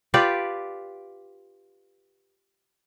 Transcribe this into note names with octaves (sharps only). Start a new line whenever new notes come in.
F4 G4 B4 D5